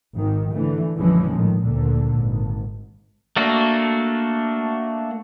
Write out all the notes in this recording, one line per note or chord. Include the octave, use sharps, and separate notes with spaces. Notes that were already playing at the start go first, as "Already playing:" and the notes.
G#1 D#3
D3 E3 A3
A#1 F#2 C#3 E3 F3 G#3
A2 D#3
D2 A#2 D3
G#1
A3 A#3 D4 F#4